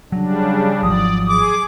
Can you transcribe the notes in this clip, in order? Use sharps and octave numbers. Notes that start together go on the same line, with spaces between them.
C#3 F#3 G3 D4
G#1 F3 F#3 D5 D#6
G#4 D6